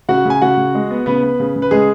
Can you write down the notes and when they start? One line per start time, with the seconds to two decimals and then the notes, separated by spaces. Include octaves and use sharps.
0.09 C#3 F#4 F#5
0.25 C#3 G#5
0.42 C#3 F#4 F#5
0.57 C#3
0.75 G#3
0.91 B3
1.06 C#3 B3 B4
1.23 B3
1.40 C#3
1.56 C#3
1.62 B4
1.71 C#3 G#3 G#4